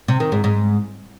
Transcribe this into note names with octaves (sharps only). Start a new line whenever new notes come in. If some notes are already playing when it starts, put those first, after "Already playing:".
C3
D#3
G#2
G#2